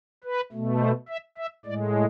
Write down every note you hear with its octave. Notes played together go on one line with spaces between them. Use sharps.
B4
B2 A3
C5
E5
E5
A2 G#3 D5